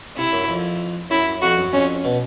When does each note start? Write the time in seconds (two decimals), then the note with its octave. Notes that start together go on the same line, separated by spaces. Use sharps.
0.17 C3 E4
0.32 F#2
0.48 F2
1.10 F#2 E4
1.42 F2 F#4
1.57 F#2
1.73 F2 C#4
2.04 B2